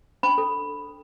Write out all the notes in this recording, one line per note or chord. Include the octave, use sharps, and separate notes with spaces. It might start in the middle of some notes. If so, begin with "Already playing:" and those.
D4 B5
A4